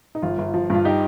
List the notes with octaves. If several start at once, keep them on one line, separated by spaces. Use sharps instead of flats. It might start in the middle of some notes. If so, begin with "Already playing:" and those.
D#4
G1 F4
G1
F3
G2 F4
D#4 G4